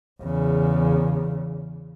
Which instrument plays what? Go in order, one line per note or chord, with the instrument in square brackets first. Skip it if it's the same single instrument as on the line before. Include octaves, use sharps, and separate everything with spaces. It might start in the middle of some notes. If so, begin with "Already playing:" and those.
[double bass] E2 C#3